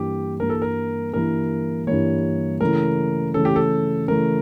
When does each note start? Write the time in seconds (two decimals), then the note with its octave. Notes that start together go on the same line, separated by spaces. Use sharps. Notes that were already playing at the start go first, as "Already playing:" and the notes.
Already playing: G2 E3 A#3 G4
0.40 G2 E3 A#3 A#4
0.50 A4
0.62 A#4
1.13 G2 E3 A#3 A#4
1.87 G2 E3 A#3 C#5
2.60 C#3 E3 A3 A#4
3.34 C#3 E3 A3 A4
3.45 G4
3.56 A4
4.08 C#3 E3 A3 A#4